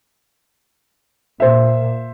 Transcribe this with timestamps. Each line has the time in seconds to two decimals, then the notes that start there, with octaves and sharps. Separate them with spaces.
1.40 A#2 C5 E5